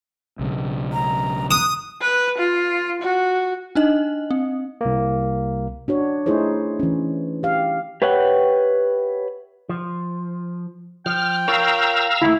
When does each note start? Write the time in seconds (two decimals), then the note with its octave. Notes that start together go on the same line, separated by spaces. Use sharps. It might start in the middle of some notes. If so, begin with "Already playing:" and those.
0.39 B1 C#3
0.93 A#5
1.51 D#6 F#6
2.01 B4
2.38 F4
3.02 F#4
3.75 D4 D#4 D#5
4.31 C4
4.81 C2 A#3
5.88 D4 F#4 C#5
6.26 A3 D#4 E4 G#4 C5 C#5
6.80 E3 C#4
7.43 G4 F5
8.02 G4 B4 C#5 E5 F#5 G5
9.69 F3
11.06 F3 G5 F6
11.48 F4 A#4 C#5 F5 A#5 E6
12.22 D#2 D#3 A3 E4